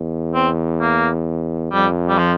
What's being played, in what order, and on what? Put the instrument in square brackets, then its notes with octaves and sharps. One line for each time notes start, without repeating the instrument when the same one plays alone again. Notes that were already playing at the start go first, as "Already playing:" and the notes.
Already playing: [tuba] E2
[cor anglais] C4
A#3
[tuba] F2 [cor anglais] G3
[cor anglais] G3
F3